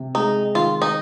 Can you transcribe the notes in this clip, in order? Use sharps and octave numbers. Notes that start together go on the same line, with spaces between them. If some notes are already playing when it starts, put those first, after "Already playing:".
Already playing: C3
G#3 D#4
D#3 F4
D#4